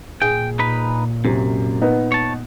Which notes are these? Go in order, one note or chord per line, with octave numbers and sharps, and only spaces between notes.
A#2 G#4 G5
D#4 B4 B5
F#2 C3
B3 D#4
C#5 A5